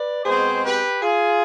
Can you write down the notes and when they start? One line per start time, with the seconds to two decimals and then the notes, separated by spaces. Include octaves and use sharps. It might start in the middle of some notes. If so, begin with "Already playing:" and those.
Already playing: B4 D5
0.24 B2 G#3 C4 G#4 C5
0.64 G4 B4
1.02 F4 G#4